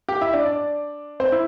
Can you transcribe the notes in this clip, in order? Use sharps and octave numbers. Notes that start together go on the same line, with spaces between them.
G4 G5
E4 E5
D4 D5
D4 D5
C4 C5
E4